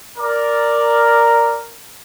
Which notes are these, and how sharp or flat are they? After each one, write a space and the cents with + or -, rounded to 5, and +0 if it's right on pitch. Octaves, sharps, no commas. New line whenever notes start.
A#4 +0 D5 +0